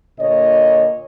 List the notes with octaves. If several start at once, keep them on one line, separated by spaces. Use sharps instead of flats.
A#2 D3 C#5 D#5